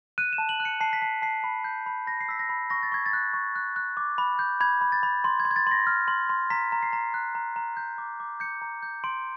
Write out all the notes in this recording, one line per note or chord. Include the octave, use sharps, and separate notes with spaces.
F#6 D#7
E7
A5
F#7
F#6
C#7
A5 C7
B6
A5 C7
A5 C7
B5
G6
B5
B5 A#6
C7
E6 B6
A#6
B5
C#6 A#6
A6
C#6 G#6
A6
F#6
C#6
F#6
F#6
D6
B5
G6
B5 G#6
B5
A6
B5
C6
G#6
C6
G#6
A6
C6 A#6
F6
C6
C6
A#5 B6
A#5
C7
A#5
F#6
A#5
A#5
G6
D6
D6
G6 C#7
A#5
G6
C6 D7